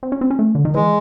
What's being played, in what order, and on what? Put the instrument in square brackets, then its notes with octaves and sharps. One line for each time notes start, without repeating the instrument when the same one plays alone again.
[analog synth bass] C4
C#4
C4
C#4
A3
D3
D#3
[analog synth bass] E3 [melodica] G#3